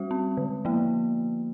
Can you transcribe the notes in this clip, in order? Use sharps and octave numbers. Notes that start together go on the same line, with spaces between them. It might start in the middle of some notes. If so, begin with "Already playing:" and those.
Already playing: G3 F#4
C4
D3
F3 A#3